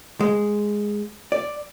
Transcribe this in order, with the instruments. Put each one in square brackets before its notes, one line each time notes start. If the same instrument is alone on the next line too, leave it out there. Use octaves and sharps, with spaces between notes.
[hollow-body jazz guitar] G#3
D5